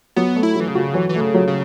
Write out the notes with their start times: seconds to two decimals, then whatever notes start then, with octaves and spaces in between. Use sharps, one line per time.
0.16 F#3 B3
0.36 A3
0.43 E4
0.55 E3 F#3
0.68 C#3
0.75 F#4
0.94 E3 F#3
1.09 E3
1.15 A3
1.21 C#3
1.34 F#3
1.48 C#3